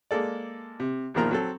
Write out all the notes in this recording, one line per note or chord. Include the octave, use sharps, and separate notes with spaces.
G#3 A#3 A4 D5
C3
E2 A#2 D#3 F3 A#4 A#5
F#3 C4 A4